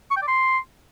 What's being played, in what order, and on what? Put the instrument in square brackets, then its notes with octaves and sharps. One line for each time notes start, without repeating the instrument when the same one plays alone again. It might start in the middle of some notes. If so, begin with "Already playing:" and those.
[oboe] C#6
G5
D5
C6